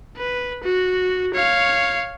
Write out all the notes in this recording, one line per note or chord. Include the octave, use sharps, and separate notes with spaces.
B4
F#4
C#5 F5